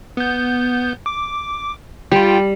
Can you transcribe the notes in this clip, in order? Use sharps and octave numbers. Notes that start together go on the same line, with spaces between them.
B3 G6
D6
G3 F4 G5